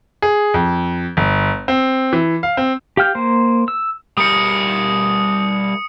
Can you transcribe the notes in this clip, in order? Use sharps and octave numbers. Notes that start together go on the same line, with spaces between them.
G#4
F2
G1
C4
E3
F5
C4
G4 F5 G5 F6 G6
A#3 C5
E6
G3 A#4 D#6 C#7